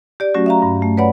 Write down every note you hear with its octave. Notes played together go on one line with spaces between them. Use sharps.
G4 D5
F#3 A3 C#4 F#4
E5 F5 A#5
G2
A3
B4 C#5 D5 F#5 B5